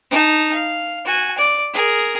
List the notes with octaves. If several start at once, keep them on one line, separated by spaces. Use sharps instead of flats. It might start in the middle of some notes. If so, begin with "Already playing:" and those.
D#4 A5
F5
F#4 G#5
D5
G#4 A#4